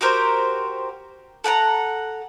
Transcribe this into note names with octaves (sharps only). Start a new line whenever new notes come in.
F#4 G4 A#4 C5
A4 F#5 G5 A#5